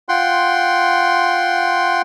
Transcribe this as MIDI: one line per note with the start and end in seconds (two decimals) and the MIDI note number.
0.09 2.02 65
0.09 2.02 78
0.09 2.02 79
0.09 2.02 84